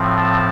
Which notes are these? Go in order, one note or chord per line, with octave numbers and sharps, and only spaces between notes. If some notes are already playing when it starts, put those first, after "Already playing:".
Already playing: A2 F3 C4
A5